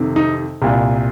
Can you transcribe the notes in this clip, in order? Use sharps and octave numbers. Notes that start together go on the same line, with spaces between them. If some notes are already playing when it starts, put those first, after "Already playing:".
Already playing: F2 C3 D#3
D#4
C2 A#2